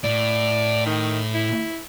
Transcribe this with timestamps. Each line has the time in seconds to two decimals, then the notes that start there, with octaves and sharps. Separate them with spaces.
0.04 A2 D5
0.86 D#3
1.34 E4